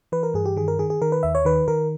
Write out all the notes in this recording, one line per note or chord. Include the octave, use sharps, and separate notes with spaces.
E3 B4
A#4
G2 G#4
G4
D#3 G#4
A#4
D#3 G#4
G#4
D#3 A#4
B4
D#2 E5
C#5
D#3 B4
D#3 A#4